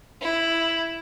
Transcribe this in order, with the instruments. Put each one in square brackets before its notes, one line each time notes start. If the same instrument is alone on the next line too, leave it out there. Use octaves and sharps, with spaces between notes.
[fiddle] E4